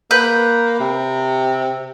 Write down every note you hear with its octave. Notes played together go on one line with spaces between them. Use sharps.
A#3 B4 G6
C3